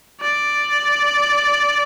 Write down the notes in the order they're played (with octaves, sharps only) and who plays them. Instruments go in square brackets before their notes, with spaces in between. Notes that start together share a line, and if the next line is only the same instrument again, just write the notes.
[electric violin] D5